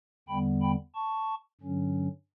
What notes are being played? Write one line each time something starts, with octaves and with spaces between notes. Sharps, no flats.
E2 D3 G3 B3 G5 B5
G5 B5
A5 C#6
G2 D3 F#3 C#4